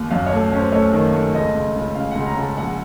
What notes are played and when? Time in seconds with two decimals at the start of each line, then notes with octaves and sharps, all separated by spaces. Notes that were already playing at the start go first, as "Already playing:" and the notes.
Already playing: D#2
0.10 F#2 F5
0.26 C#5
0.32 A3
0.52 C#4 C5
0.72 A3 C#5
0.93 D#3
1.14 A3
1.34 C#2 D#5
1.55 C#2
1.76 C#2
1.95 C#3 F5
2.11 C#2 F#5
2.26 A#5
2.37 C#2 A5
2.57 A#1 F#5